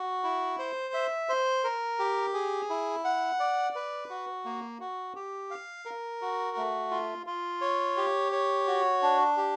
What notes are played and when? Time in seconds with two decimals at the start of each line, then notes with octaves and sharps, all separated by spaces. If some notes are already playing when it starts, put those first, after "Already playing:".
Already playing: F#4
0.24 E4
0.59 C5
0.94 E5
1.29 C5
1.64 A#4
1.99 G4
2.34 G#4
2.70 E4
3.04 F#5
3.40 D5
3.75 B4
4.10 F#4
4.45 A#3
4.80 F#4
5.15 G4
5.51 F5
5.85 A#4
6.21 F#4
6.57 A3
6.91 F4
7.26 F4
7.61 C#5
7.97 G4
8.32 C#5
8.67 F#4
9.02 D4
9.37 G4